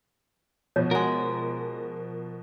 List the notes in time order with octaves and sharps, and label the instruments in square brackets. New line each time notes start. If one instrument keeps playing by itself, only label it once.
[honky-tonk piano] B2 F3 [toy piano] C#5
[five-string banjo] G#3 F#4 [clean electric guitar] A#4